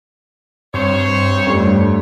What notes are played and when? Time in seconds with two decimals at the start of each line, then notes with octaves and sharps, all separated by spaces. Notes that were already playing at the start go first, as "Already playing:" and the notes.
0.74 G2 C4 C5 C#5
1.47 F2 G3 A3 D4 G4